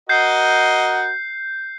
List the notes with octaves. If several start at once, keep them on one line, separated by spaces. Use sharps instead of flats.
F#4 A#4 D#5 G6 C7